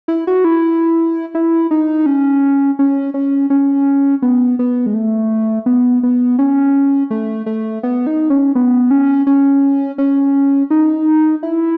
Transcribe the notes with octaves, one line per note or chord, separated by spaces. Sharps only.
E4
F#4
E4
E4
D#4
C#4
C#4
C#4
C#4
B3
B3
G#3
A3
B3
B3
C#4
A3
A3
B3
D#4
C#4
B3
C#4
C#4
C#4
D#4
E4